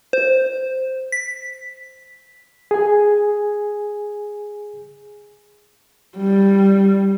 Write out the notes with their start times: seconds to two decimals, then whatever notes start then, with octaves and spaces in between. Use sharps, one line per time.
0.13 C5
1.12 B6
2.71 G#4 G#5
6.17 G3